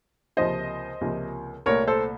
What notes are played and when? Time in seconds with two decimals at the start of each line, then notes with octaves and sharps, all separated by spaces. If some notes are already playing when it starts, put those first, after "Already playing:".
0.37 C#2 C3 F3 A#3 C5 D#5
1.01 C#2 C3 F3 A#3
1.66 C2 A#2 A3 A#4 C#5
1.87 A4 C5